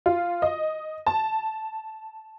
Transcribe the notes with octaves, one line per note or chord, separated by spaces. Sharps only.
F4
D#5
A5